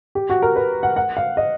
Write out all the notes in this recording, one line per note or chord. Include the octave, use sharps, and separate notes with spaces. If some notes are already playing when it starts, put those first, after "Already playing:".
G4
F#4
A#4
B4
F#5
F#5
F5
D#5